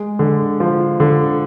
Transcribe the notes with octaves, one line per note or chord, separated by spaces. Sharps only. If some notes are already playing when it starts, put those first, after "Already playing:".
Already playing: G#3
D3
F3
D3